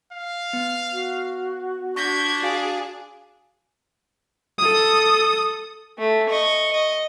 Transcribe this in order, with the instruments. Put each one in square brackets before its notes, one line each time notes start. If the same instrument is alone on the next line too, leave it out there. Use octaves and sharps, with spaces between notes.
[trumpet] F5
[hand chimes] B3
[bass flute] F#4
[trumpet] D4 [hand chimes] C#6 A#6 B6 [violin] G6 G#6
[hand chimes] F#4 F5 G#5 [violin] G#4 D5
[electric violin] A4 D#6
[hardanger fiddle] A3
D#5 C#6
D#5